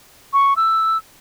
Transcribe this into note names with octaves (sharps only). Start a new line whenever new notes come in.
C#6
E6